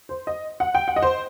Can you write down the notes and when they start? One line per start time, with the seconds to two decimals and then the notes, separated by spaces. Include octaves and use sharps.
0.09 C5
0.27 D#5
0.60 F#5
0.75 G5
0.88 F#5
0.96 D#5
1.02 C5